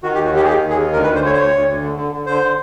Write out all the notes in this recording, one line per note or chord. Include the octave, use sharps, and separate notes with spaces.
D#3 F#4
G4
D#2
F#4
D#3 G4
G#4
D#3 G4
D#2
G#4
D#3
D2 A#4
B4
D2
C5
D3 C#5
C5
D2 C#5
D2
D2
D3
D3
D3
D3 C5
D3